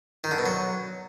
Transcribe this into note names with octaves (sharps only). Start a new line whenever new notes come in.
D#3
D3
B2
F#3